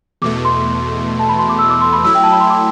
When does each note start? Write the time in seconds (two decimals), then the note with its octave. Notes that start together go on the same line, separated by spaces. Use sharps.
0.22 E2 B2 A3 D6
0.45 C6
1.19 A5
1.29 B5
1.39 C6
1.49 D6
1.59 E6
1.70 D6
1.81 C6
1.93 B5
2.04 F#3 A3 E4 E6
2.15 G5
2.23 A5
2.32 B5
2.40 C6
2.50 D6